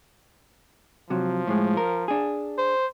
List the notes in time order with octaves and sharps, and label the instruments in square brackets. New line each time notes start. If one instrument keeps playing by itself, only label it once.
[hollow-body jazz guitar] C3 F#3 [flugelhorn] F3
[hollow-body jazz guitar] A2 G#3
A#4
D4 G#4
[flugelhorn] C5